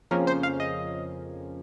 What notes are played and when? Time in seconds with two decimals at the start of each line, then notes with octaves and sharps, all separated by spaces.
0.11 F2 C#3 F3 A#3 C#4 A#4
0.27 C5
0.43 F5
0.60 D#5